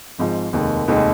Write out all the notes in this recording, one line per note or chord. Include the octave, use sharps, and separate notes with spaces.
G#1 G#2 F3
F1 D#2 D#3 G#3
F1 D#2 D#3 G#3